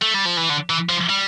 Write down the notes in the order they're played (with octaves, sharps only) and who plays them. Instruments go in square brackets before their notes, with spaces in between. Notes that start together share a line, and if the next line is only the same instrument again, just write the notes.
[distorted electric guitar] A3
G3
F3
E3
D3
E3
F3
G3